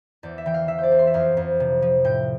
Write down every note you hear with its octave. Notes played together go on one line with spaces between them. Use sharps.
E2 D5
E5
E3 G5
F5
E3 E5
C5
D5
E2
C6
E5
F2 F5
F2
C3
F3
A2 G5